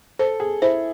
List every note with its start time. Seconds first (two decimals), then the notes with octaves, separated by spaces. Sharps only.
0.19 A4 C5
0.40 G#4
0.62 E4 C5